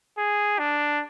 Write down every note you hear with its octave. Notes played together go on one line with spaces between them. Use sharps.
G#4
D4